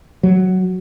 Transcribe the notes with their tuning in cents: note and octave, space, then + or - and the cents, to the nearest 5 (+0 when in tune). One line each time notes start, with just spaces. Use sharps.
F#3 +5